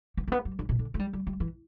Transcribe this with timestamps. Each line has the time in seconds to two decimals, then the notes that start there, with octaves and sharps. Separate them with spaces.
0.17 B3
0.28 A3
0.32 B3
0.45 G3
0.59 D3
0.69 B2
0.79 D3
0.94 A3
0.99 G3
1.13 G3
1.27 G3
1.40 E3